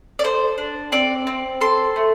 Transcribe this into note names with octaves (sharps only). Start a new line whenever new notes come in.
D5
A4 C5
D4
C4 D5
C4
A4 C6
A3